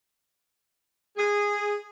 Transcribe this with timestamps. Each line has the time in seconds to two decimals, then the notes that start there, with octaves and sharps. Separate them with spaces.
1.17 G#4